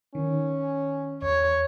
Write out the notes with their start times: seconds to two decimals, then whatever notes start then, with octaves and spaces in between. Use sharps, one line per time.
0.15 D#3 C#4
1.22 E2 C#5